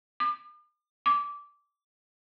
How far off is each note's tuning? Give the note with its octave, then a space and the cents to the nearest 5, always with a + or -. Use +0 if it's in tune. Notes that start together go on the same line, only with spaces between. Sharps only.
D6 +45
D6 -15